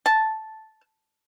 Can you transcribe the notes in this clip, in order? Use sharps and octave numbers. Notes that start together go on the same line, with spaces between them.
A5